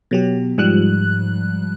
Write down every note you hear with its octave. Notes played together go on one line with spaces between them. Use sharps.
B2 F#3 G4
G#2 F3 G3 F#6